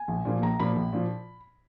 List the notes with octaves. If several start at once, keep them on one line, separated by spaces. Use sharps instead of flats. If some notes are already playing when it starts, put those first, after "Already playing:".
Already playing: G#5
A#1
A#2 F3 A#3
A#1 A#5
A#2 F3 A#3 B5
A#1
A#2 F3